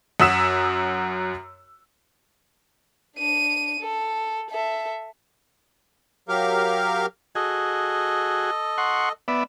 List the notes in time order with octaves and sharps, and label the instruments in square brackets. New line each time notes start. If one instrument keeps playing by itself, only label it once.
[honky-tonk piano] F#2 F#4 D#6 E6 B6 E7
[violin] D4 D#7
A4
A4 E5
[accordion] F#3 G4 A#4 F5
[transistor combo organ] F#4 G#4 [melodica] A4 D#5
[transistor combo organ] F#5 C6 C#6
B3 D5 E5